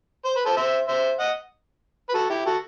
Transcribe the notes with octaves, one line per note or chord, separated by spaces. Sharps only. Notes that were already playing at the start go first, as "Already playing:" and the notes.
C5
B4
A4 C5
C5 E5
C5 E5
D#5 F#5
B4
F#4 A4
E4 G4
F#4 A4